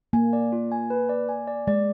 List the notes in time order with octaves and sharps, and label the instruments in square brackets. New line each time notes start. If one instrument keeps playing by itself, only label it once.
[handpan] A#3 [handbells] G#5
[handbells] D5
F4
G#5
B4
D5
G#5
D5
[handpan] G#3 [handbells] D5